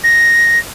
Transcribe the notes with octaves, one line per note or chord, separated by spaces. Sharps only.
A#6